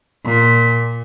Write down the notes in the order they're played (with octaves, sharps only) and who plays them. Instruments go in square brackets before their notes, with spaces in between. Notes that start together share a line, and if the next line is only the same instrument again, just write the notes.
[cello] A#2